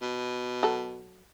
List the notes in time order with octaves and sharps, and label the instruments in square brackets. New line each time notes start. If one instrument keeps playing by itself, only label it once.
[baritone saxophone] B2
[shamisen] F#3 A4